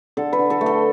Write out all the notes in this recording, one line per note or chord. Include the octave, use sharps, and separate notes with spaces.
D3 A4
B4
D3
A4
A3
A4